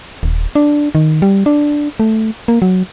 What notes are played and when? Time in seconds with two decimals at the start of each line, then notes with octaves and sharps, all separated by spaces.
0.23 D#1
0.55 D4
0.95 D#3
1.22 G3
1.46 D4
2.00 A3
2.48 A#3
2.62 F#3